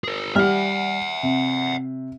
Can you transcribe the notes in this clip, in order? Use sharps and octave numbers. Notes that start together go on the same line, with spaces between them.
G#4 A#4
G3 E5 F#5 F6
C3